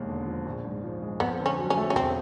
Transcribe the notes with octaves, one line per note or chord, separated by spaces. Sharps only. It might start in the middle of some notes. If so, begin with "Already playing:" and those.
Already playing: E1 D#2 G#3
D3
F3
A#1
G#2
F3
G#3
F2 B3
D3
C#4
F#3
C#4
A3
C#4
E1 C4